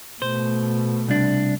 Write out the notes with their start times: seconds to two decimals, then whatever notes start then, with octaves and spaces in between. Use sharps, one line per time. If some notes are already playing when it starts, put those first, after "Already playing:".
0.22 B2 A3 C5
1.09 C2 D4